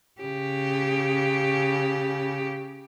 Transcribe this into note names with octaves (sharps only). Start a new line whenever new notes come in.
C#3 G4